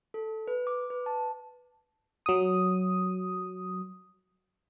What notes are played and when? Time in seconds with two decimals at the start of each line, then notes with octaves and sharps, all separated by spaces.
0.14 A4
0.47 B4
0.67 D6
0.90 B4
1.06 A5
2.26 F#3 D#6